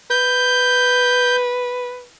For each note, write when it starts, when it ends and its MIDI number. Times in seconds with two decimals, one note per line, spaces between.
0.10 2.04 71
0.10 1.36 91